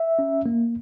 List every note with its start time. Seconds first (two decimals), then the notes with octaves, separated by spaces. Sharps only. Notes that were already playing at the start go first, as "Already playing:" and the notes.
Already playing: E5
0.19 C#4
0.46 A#3